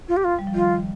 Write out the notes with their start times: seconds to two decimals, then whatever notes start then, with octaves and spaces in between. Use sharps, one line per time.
0.08 F4
0.17 G4
0.24 F4
0.39 G3
0.47 F3
0.54 D#3 F4